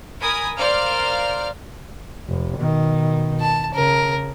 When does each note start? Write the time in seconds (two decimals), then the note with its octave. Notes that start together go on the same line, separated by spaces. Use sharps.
0.22 A#4 G#5 B5 D#6
0.57 A#4 C5 D5 F5 F6
2.28 F1
2.58 B2 D#3
3.41 A5
3.75 C#3 A#4